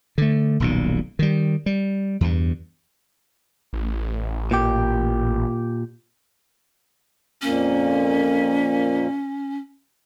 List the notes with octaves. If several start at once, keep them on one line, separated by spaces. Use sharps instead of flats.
D3 A3
D#1 B1 A#2
D#3 G3
G3
E2 G2
A1
A#2 G4
F2 A#2 A#3 C#4